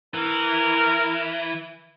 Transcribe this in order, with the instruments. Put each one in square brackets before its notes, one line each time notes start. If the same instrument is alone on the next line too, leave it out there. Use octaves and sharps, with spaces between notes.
[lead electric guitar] E3 [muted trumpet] A#4